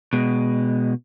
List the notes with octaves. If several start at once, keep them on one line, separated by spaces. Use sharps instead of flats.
B2 G#3